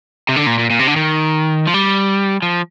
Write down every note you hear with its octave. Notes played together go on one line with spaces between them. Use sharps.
C3
D3
A#2
A#2
A#2
C3
D3
D#3
F3
G3
F3